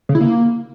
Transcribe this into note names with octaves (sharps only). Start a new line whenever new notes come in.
C#3
E4
A#3